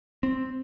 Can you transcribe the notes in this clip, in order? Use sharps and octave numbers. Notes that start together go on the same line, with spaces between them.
C4